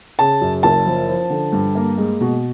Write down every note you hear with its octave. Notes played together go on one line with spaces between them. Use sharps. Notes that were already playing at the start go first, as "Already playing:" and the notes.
C#3 A5
F#2
F#1 A5
F3
F3
D3
G2
A#3
G#3
B2